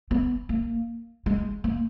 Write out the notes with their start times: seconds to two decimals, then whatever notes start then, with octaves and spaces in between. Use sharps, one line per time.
0.11 B3
0.49 A#3
1.26 G#3
1.64 A#3